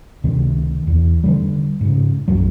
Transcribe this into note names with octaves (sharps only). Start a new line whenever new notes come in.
C#2 C3 D#3
E2
D3 D#3 G3
G#2 C#3
F#1 B1 F#2 F#3